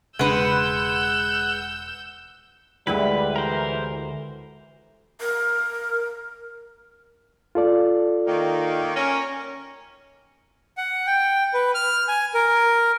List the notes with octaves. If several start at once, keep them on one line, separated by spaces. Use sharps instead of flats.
E1 C#3 G#3 D4 B4 F#5 E6 G6
D2 G3 G#3 E4 G4 B4
E3 A#4 C5
A#4
F4 A4 D5
D#3 A#3
C#4 A#4
F#5
G5
B4
F6
G#5
A#4